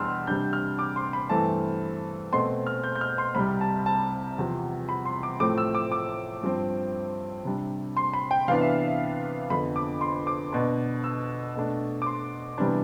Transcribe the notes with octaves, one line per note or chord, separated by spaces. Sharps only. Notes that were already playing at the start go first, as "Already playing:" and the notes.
Already playing: E2 B2 G3 D4 C6 E6 F6
C3 G3 D4 G6
F6
D6
C6
B5
G2 E3 A3 C4 A5
B2 A3 C4 C6
F6
G6
G6
F6
C6
C2 C3 G3 B5
A5
A5
E2 C3 F3
B5
C6
D6
A2 F3 A3 C4 D6
E6
D6
D6
G2 F3 C4
C3 G3 D4
C6
B5
G5
C3 E3 B3 D4 F5
E5
E5
F2 D3 F3 B3 B5
D6
C6
D6
B2 B3 D4
E6
B2 A3 D4
D6
C6
C3 E3 G3 B3 D4